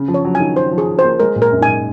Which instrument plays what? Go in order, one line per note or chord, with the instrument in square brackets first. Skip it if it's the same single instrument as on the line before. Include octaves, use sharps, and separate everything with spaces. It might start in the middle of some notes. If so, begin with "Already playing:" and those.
Already playing: [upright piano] C#3
F3
[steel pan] C#5
[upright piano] F#3
[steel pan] G#5
[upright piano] D#3
[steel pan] C5
[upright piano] F3
[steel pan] G#4
C5
[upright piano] A#3
[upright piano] G#3 [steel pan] A#4
[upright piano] A#2
[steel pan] A#4
[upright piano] F#2
[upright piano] G#2 [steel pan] G#5
[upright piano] A#2